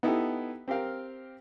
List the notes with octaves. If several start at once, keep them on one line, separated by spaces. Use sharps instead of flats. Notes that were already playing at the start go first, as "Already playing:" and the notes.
B3 D#4 E4 G4 A4
C4 G4 A#4 F5 G5